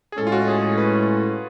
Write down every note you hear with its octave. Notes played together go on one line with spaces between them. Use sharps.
G#4
A2 G#3 C#4 A4
F4
F#4
G#4
G#4
B4